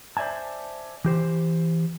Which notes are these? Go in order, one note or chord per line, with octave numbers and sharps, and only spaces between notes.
C5 D5 E5 G#5 A5
E3 G4 C5